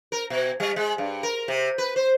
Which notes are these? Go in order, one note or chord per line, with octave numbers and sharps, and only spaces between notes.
A#4
B2
G3
G#3
G2
A#4
C3
B4
C5